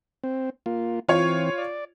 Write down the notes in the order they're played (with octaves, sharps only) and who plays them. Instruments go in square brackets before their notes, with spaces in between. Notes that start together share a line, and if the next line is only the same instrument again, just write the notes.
[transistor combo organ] C4
A#3 F4
[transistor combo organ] E3 C4 [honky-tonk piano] F4 C#5
[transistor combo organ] D5